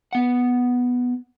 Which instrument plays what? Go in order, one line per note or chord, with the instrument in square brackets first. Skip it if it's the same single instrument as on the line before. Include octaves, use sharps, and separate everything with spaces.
[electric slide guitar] B3 F#5